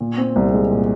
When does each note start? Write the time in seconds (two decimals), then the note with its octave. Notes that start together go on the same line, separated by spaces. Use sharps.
0.01 A#2
0.18 C4
0.36 C2
0.53 G#3
0.71 A#2